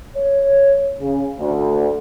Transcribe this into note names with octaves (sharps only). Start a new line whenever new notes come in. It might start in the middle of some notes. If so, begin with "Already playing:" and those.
C#5
C#3
D2